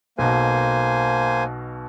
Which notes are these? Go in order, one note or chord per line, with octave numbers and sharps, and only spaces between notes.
B1 B2 A#3 C5 G#5